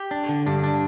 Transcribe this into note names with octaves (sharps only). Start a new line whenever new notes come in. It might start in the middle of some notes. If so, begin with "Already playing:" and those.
Already playing: G4
D4
D3
G2 D4
D4